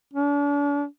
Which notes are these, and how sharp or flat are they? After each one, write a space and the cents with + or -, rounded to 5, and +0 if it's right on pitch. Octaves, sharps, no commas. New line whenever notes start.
D4 -40